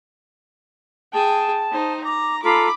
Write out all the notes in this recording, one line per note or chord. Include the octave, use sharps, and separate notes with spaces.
G#4 G5 A5
D#4 C5
A#5 D6
F4 A4 A#5 B5 D6